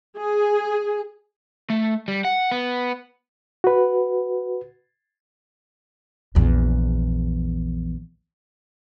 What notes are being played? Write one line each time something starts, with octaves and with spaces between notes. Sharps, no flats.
G#4
A3
G3
F#5
B3
F#4 B4
A#1 E2